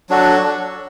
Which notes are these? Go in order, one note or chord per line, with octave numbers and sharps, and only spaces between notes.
F#3 D4 F#4 A4